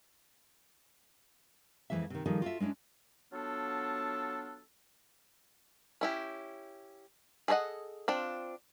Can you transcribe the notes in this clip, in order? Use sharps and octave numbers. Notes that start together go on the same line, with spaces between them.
F2 D#3 E3 G#3 E5
C3 D#3
D#3 F3 G3 D#4 G#4 A4
F4 F#4 A4 E5
G#3 C#4 D4 E4
F#3 B3 D4 F4 A4
C#4 E4 G4
G#4 A4 C#5 D#5 F#5
C4 D4 F4